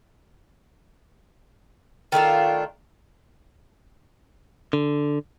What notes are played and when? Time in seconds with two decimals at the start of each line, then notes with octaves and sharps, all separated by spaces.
2.12 D#3 A3 D4 F4
4.73 D3